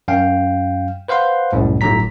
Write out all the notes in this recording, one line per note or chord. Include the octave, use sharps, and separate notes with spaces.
F#2 F5 G5
B4 C5 F5 F#5 C6
C2 F#2 A2
G1 A2 D3 F#3 A#5 B6